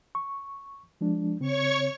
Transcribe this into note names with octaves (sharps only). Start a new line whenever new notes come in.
C#6
F3 G#3 D4
C#3 C4 C#5 C#6